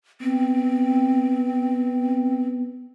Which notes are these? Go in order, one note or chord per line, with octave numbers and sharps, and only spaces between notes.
B3 C4